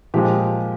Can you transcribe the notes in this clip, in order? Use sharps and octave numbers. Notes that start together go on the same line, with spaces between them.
A#2 F3 G#3 G4